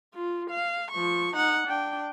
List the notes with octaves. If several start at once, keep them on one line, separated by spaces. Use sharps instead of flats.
F4
F5
F3 C#6
D#4 F#5
D4 G5